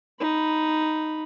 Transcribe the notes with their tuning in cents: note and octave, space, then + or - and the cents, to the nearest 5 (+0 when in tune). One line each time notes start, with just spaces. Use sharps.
D#4 +0 B5 +0